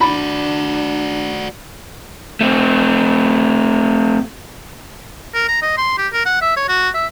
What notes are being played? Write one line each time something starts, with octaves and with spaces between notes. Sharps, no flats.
D4 F#4 D5 B5
A3 C4
A#4
A#5
D#5
C6
G4
A#4
F#5
E5
C#5
F#4
E5